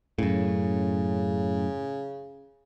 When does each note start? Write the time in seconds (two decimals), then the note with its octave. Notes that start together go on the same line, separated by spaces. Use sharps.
0.19 F#2 A2 C#3